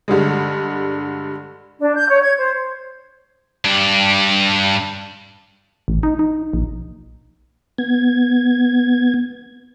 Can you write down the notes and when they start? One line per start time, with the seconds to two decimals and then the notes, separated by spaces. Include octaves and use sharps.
0.08 G2 D3 G3 G#3
1.80 D4
1.96 G6
2.08 C#5
2.22 G#6
2.38 C5
3.65 G2 D4
5.88 A1
6.03 D#4
6.19 D#4
6.53 A#1
7.78 B3 G#6